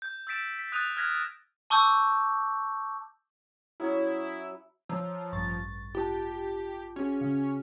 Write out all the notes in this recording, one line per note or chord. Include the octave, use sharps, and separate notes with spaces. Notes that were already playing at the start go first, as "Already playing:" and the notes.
G6
E6 G6 A6 B6 D7 E7
B6
D#6 F#6 G6 A6 D#7 F7
F6 F#6 G#6 A#6 B6
A5 C#6 D6 E6 G6
F#3 C#4 E4 G#4
F3 C#5 A#5 E6
A1 G2 C#6 A6
F4 G4 A5
C#4 F#4 G#4
C#3